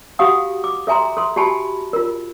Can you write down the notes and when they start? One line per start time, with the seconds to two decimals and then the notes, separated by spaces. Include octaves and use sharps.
0.19 F#4 G4 F5 F#5 G#5 D#6
0.64 D6
0.87 A4 E5 G#5 A#5 C6
1.17 A4 C6
1.36 F#4 G4 G#5 A5 B5
1.93 F4 A#4